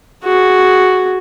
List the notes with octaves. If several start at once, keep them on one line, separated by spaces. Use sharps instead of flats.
F#4 G#4